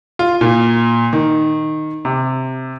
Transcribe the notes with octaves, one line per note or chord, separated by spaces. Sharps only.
F4
A#2
D#3
C3